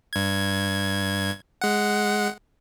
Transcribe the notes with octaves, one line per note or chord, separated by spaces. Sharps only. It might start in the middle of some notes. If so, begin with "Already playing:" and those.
G2 G#6
G#3 F#5